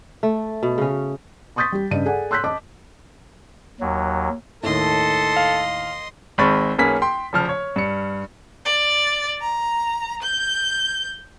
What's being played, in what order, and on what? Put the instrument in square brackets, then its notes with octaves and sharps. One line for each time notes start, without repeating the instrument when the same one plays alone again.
[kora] A3
B2
C#3 C#4
[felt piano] C6 C#6 D#6 G6 A6 B6
G3 G4
G2 C#3 D#5 D#7
G#4 A4 D5 F#5 G#5
C6 E6 F#6 G6 B6
D#5 A5 D6
[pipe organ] D#2 F#3
[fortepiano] D#2 A2 [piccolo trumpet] A4 [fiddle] D#5 C6
[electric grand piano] F5
[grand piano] G#1 G#3 C4 B5 C#6 A6
B1 A#3 C#4 G#4 B4 B6
G5 C6
F1 C#3 F3 A5 F6
C#5
G2 C#7
[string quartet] D5
A#5
G6